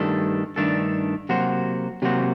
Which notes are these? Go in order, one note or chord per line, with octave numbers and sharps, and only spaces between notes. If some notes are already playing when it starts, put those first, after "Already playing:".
Already playing: G2 D#3 A3 D4 A4
G2 D#3 A3 D4 A4
C3 F#3 A#3 F#4 C5
C3 F#3 A#3 F#4 C5